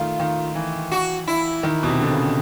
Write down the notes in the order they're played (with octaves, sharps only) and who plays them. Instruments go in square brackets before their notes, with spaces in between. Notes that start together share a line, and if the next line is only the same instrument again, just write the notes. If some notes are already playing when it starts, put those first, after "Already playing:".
Already playing: [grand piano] D#3 A3 [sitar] F4
[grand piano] D#3
E3
[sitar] F#4
E4
[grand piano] D#3
B2
C3
D3
C#3